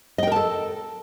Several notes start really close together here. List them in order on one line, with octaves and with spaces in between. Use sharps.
D#5 G5 A#4 A5 A4